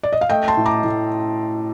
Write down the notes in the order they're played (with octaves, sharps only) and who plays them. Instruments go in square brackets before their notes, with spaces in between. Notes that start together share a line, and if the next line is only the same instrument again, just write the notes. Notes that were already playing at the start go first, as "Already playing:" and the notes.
[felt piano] D5
D#5
F5
A3 D#5 G5
A5 C6
A2
A#5 D6
A2